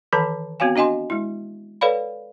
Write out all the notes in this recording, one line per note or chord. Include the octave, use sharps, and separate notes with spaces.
D#3 E3 A4 A5 A#5
B3 C4 F#4 C#5 F5 G#5
D4 F#4 D#5 G#5 C6
G#3 E4
A4 B4 C#5 D5 F5 B5